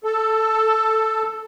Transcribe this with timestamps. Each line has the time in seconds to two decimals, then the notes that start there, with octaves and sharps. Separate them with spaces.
0.04 A4